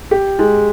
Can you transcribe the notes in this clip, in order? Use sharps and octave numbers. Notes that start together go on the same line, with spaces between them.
G4
G#3